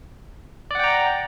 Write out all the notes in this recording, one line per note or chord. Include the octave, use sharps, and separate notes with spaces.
D5 F#5 G5 A#5